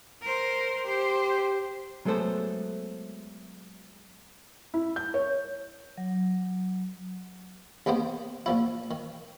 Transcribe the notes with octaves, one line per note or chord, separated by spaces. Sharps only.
A#4 C5
G4 C5
F#3 G#3 A3 B3 A4 C5
E4
G6
C#5
F#3
C2 D#3 A#3 B3 C5
A#2 F3 E4
D#3